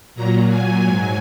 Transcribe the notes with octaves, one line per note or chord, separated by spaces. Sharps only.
A#2 F#3 A#5
G#5
G#2 F#3 G#5